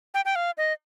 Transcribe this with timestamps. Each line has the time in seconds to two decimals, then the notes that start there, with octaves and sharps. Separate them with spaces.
0.14 G5
0.25 G5
0.36 F5
0.58 D#5